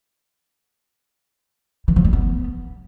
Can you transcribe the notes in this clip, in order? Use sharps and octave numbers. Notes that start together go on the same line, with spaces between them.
E3
F3
G#3
B3